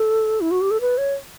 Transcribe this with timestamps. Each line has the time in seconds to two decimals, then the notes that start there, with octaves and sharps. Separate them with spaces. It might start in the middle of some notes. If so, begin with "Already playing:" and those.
Already playing: A4
0.41 E4
0.51 F#4
0.61 G4
0.71 A4
0.81 B4
0.98 C#5